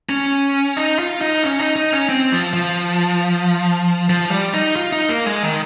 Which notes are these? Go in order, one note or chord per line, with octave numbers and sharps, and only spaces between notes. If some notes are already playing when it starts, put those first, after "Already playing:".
C#4
D#4
F4
D#4
C#4
D#4
D#4
C#4
C4
F3
F3
F3
G3
D#4
F4
D#4
A#3
G#3
D#3